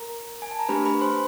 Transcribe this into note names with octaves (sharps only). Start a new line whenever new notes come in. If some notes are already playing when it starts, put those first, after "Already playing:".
Already playing: A#4 A#5
G#5
A5
A#5
A3 D4 G4 B4 B5
B4 B5
C5 C6